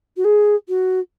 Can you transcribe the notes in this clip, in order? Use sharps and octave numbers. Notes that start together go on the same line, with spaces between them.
F#4
G#4
F#4